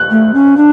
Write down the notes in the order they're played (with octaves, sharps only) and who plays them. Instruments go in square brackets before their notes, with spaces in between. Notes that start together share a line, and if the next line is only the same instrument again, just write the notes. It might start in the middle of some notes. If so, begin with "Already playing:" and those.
Already playing: [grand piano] F#6
[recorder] A3
C#4
D4